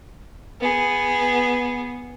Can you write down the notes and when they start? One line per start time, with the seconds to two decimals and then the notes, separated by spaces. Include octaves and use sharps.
0.61 B3 G#4